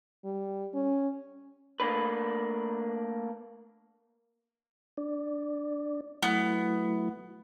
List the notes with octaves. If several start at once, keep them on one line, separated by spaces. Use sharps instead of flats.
G3
C#4
A3 A#3 D4 B4
D4 D5
F#3 A3 B3 E4